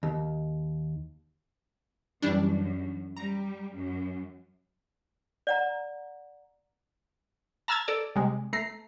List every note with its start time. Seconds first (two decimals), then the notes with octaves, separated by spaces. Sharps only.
0.03 D#2
2.22 F#2 E3 G3 D4
3.17 G3 A#5
3.76 F#2
5.47 D5 F#5 A#5
7.68 A5 A#5 E6 F6 G#6 A6
7.88 A4 D5
8.16 C3 G3 G#3
8.53 A3 A#5 C7